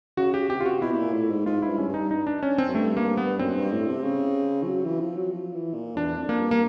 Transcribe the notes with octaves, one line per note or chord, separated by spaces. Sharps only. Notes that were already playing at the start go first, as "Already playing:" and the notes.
C#3 F#4
G4
C3 G4
F4
F#4
B2 E4
B2
A#2
A2
G#2
G#2 F4
G2 E4
C#4
G2
D#4
D#4
D4
C#4
C4
F#2
G2 A3
A#3
B3
F#2 C4
G2
A2
C3
C#3
F3
F#3
E3
F3
F#3
F3
E3
A#2
E2 D4
F2
A#3
G2
A#3